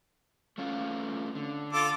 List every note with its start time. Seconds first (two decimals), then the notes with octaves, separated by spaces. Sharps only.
0.58 A3 C#4 F4
1.35 D3
1.73 F4 A4 D6